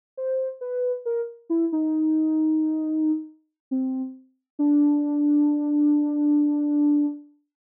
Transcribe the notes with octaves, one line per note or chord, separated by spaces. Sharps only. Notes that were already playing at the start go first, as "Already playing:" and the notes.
C5
B4
A#4
E4
D#4
C4
D4